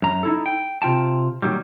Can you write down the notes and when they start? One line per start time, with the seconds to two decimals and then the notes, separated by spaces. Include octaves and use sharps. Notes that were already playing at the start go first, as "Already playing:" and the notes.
0.02 F#2 A#5
0.23 D#4 E4 A4
0.46 G5
0.82 C3 F4 G5 A5
1.42 A#2 D#3 F#3 G3